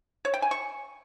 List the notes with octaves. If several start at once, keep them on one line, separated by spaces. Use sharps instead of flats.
C#5
G5
G#5
C#6